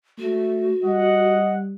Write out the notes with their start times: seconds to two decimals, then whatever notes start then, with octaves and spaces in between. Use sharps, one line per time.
0.19 A3 F#4
0.84 G3 D#5 F#5